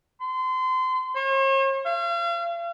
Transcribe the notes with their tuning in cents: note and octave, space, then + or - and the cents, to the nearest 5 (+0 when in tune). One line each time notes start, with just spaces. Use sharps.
C6 -30
C#5 -45
F5 -40